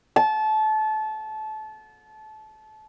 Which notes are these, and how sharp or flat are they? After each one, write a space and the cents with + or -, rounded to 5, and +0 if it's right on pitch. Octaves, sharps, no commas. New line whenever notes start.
A5 -25